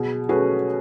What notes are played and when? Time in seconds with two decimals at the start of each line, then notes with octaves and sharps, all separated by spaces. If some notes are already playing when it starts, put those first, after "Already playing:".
Already playing: B2 G#4
0.29 A3 C#4 F#4 G#4 B4